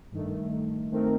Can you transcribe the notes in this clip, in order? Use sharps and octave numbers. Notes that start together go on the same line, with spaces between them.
G2 D#3 A3
D#3 A3 C4 D#4 A#4